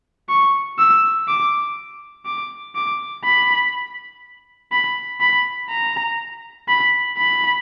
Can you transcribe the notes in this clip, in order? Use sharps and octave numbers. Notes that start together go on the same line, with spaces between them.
C#6
E6
D6
D6
D6
B5
B5
B5
A#5
B5
B5